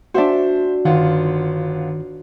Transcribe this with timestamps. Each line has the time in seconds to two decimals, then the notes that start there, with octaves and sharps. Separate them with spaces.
0.14 D4 F#4 C5 E5
0.85 G1 D#3 F4 F#5